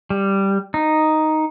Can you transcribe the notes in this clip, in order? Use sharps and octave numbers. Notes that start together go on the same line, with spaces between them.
G3
D#4